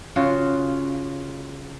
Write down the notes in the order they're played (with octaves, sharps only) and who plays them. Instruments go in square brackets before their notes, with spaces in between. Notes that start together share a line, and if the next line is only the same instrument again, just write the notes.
[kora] C#3 F4 F#4